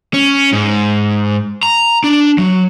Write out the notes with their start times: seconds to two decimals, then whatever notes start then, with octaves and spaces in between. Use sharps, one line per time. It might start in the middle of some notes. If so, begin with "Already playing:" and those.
0.14 C#4
0.53 G#2
1.63 A#5
2.04 D4
2.38 F#3